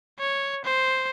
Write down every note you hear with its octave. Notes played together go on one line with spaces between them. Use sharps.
C#5
C5